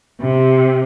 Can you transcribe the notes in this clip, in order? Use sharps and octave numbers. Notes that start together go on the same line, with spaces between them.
C3